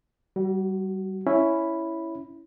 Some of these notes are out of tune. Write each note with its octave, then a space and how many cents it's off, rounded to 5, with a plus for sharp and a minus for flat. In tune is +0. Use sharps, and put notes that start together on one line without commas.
G3 -25 F#4 +20
C#4 +0 E4 +0 B5 +0